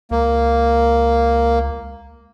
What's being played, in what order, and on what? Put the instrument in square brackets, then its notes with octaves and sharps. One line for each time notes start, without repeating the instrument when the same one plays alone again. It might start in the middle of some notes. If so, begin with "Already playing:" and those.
[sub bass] C#2 [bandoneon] A#3